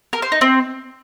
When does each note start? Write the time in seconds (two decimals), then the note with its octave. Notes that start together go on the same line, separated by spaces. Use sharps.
0.13 A#4
0.22 C5
0.32 D#4
0.41 C4